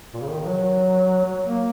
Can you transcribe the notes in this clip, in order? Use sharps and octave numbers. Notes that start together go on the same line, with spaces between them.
A#2
C#3
D#3
F#3
F#3
A#3